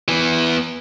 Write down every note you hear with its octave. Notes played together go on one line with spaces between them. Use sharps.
E3 B3